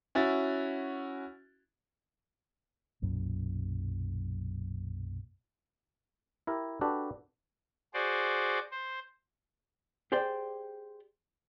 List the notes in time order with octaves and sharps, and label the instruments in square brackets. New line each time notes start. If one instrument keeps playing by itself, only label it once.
[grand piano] C#4 E4 F#4 A6
[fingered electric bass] B1 F#2 A#2
[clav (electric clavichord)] E4 G4 A#4
D4 F#4 G4 A4 B4
[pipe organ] F#4 G#4 C5 D5
C5
[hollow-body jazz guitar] G4 G#4 C5 D5 G5